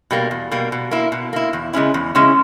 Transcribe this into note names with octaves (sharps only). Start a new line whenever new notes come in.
B2 G3 A#3
E2
B2 G3 A#3
B2
A#3 E4
B2
A#3 E4
E2
C#3 G#3 C#4 E4
E2
C#3 G#3 C#4 E4